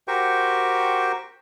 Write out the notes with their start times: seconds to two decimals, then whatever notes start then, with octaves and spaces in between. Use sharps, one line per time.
0.08 F#4 G4 A#4 C5 G5 C#6